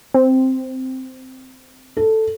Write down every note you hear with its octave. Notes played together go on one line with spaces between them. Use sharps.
C4
A4